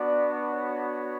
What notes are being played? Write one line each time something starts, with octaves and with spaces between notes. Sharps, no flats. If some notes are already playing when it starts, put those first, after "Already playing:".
Already playing: B3 D4 F#4 D5
C#5